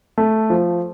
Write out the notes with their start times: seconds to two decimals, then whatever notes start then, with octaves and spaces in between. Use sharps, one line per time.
0.18 A3
0.50 F3